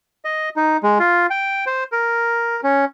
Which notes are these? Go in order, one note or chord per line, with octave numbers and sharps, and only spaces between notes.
D#5
D#4
G#3
F4
G5
C5
A#4
C#4